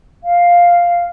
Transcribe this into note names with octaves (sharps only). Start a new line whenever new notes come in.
F5